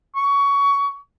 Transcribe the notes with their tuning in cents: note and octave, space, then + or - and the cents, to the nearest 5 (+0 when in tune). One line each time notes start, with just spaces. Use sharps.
C#6 +20